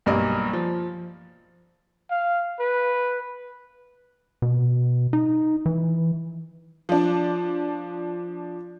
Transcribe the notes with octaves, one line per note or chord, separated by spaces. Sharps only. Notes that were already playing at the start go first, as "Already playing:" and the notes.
B1 G2 A#3 D5 D#5
F3
F5
B4
B2
D#4
E3
F3 D4